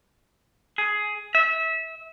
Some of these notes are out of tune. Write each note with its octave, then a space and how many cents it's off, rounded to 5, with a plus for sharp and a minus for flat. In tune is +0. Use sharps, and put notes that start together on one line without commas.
G#4 +15
E5 -25